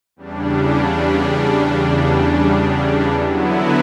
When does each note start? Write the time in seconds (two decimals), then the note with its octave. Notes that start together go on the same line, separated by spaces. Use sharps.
0.16 E2 C#3 G3 D4
3.12 D3 F#3 B3 E4